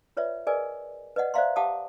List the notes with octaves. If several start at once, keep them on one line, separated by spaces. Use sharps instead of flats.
F4 B4 C#5 D5 E5
G#4 A#4 B4 D5 D#5 G#5
B4 D5 D#5 F#5
C5 D5 E5 F5 A#5 C6
G4 F5 F#5 A5 D6 D#6